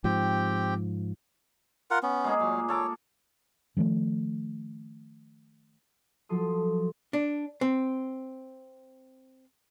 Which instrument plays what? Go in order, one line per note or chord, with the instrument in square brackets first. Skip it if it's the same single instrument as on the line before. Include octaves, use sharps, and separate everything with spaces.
[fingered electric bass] G#2 F3 [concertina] C4 G4 G5
[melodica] F4 A#4 F#5
B3 C#4
[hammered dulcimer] G#3 A#3 G#4
[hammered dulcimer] A#2 [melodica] F#3
[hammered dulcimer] A#3 A4 D6 [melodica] C#5
[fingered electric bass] D#3 F3 G3 A3
[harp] F3 F#3 A4 C6 D#6
[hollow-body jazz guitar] D4
C4